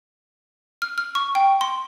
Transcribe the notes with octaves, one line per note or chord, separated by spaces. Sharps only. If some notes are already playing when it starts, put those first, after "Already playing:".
F6
F6
C#6
G5
C6